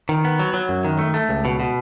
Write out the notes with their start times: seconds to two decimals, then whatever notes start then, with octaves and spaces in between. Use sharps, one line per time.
0.09 D#3
0.24 B3
0.40 F#3
0.54 F#3
0.69 F#2
0.85 D#3
0.99 A3
1.14 A3
1.29 C#2
1.45 B2
1.60 B2